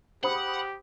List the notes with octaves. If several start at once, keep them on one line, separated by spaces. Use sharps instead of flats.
G4 C5 F#5 B5 D#6